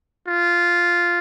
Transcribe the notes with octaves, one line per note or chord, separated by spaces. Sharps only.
F4